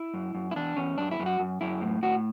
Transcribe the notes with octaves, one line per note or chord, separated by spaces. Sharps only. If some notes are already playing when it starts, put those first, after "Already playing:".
Already playing: E4
F#2
F#2
E4
E2 D4
E2 C#4
F#2 D4
E4
F#2
F#4
F#2
F#2 E4
A2
A2 F#4